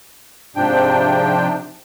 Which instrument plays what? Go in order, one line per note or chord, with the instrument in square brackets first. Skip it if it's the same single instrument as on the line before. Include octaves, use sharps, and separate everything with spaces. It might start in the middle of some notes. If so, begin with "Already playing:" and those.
[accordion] G#2 C3 F3 D4 G5